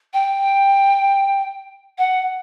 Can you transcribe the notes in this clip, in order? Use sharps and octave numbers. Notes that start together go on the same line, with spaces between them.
G5
F#5